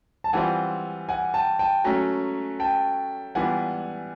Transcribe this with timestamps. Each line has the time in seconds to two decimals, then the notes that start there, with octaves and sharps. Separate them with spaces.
0.24 A5
0.33 E3 G3 C4 F4 F#5 G#5
1.09 F#5 G#5
1.34 G5 A5
1.59 G5 A5
1.84 F#3 A3 C#4 G#5 A#5
2.59 G5 A5
3.35 E3 G3 B3 D4 F4 F#5 G#5